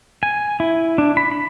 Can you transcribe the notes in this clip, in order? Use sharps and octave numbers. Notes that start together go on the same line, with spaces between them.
G#5
E4
D4
B5
B5